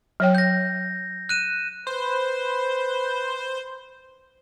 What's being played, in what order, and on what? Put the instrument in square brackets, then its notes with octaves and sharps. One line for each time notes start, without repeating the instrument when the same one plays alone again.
[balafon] F#3 C#5 G5
[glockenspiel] G6 A#6
F#6 D#7 E7
[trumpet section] B4 [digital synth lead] C5